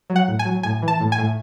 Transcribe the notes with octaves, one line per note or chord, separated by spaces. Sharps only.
F#3
F#5
A2
G#5
F#3
A2 G#5
E3
A5
A2
G#5
A2